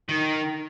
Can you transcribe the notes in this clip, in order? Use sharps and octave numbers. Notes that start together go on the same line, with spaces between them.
D#3